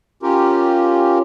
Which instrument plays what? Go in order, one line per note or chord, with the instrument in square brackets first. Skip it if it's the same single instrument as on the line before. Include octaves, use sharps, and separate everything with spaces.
[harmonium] C#4 F4 G4 A#4